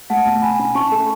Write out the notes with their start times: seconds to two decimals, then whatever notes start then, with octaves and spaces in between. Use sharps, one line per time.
0.10 A3 F#5 A5
0.26 B2
0.42 B2 G#5 B5
0.59 C#4
0.75 C#4 A5 C#6
0.92 A3